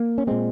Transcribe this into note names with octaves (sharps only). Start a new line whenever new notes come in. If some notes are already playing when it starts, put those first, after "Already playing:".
Already playing: A#3
C#4
A#2 G#3 C4